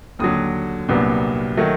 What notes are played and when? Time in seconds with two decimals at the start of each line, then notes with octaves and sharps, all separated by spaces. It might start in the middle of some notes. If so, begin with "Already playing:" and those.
0.19 D#2 D3 F#3 D#6
0.88 C2 A#2 F#3 B3 D4
1.57 D#3 F#3 A3